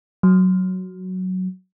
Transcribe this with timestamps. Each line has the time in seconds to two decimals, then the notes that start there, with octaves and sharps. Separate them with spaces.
0.23 F#3